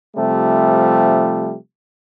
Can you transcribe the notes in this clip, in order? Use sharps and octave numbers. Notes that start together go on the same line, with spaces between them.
C3 F3 G3 A3